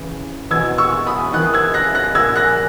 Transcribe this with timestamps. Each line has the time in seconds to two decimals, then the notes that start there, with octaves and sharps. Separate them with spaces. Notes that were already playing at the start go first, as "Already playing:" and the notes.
Already playing: E2 C#3 E3
0.51 E2 B2 E6 G#6
0.78 C#6 E6
1.07 B5 D#6
1.33 E2 D#3 D#6 F#6
1.54 E6 G#6
1.74 F#6 A#6
1.95 F#6 A#6
2.15 A#2 E6 G#6
2.36 F#6 A#6